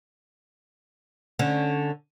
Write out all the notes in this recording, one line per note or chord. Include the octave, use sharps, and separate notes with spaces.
D3 C#4